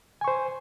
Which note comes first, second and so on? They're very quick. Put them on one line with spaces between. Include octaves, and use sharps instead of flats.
G#5 C#6 C5